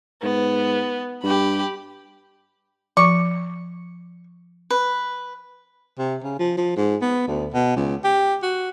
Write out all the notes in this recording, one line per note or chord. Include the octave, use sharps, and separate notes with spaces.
G#2 B3
G2 G4 B5
F3 C#6
B4
C3
C#3
F3
F3
G#2
B3
D2
B2
C#2
G4
F#4